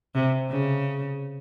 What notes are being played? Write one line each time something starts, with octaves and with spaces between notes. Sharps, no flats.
C3
C#3